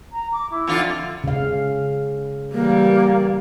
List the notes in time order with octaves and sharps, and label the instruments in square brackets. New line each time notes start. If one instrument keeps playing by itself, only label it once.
[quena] A#5
D6
E4
[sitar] F2 D3 F4
[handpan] C#3 F5
[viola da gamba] E3 G3 [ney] A#3